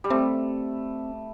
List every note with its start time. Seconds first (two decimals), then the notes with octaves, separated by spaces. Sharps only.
0.04 G3
0.10 A3 C4